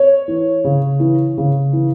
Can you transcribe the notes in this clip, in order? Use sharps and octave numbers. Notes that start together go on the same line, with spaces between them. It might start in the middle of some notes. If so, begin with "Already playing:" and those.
Already playing: C#5
E3
C#3
E3
C#3
E3